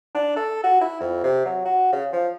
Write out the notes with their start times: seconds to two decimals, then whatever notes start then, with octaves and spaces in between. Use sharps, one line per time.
0.15 D4
0.37 A4
0.63 F#4
0.81 E4
1.00 F2
1.23 C3
1.45 F#3
1.65 F#4
1.93 C#3
2.13 F3